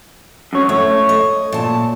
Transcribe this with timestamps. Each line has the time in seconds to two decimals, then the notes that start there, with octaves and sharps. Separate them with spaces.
0.53 F#2 C#5
0.69 A3 C#5
1.09 D#5
1.52 A#2 A5